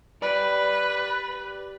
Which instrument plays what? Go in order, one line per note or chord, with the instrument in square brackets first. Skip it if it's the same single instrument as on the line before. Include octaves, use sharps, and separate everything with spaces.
[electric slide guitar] G4 D5 [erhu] B4